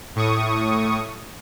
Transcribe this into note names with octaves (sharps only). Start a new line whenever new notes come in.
A2 C#6 D#6